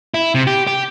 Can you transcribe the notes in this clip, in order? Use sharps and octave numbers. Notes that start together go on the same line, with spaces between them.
E4
C3
G4
G4